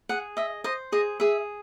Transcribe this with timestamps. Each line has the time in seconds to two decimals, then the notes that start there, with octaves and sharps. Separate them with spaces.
0.09 G#4 F#5
0.37 D#5 E5
0.64 C5 D#5
0.92 G#4 D#5
1.20 G#4 E5